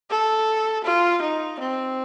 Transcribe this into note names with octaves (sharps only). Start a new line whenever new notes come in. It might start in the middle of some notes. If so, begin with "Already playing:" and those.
A4
F4
D#4
C4